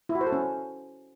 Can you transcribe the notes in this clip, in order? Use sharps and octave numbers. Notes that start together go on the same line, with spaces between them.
E4
F#4
C5
A4
C#4